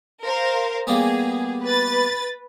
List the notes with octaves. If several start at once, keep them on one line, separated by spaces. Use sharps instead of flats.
A#4 C5 F5
G3 A#3 B3 G#4
B4 A6